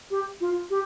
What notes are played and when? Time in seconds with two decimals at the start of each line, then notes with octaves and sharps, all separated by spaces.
0.11 G4
0.41 F4
0.70 G4